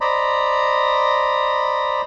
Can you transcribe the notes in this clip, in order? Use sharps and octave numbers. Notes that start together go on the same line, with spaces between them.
C5 D5 D#5 A#5 B5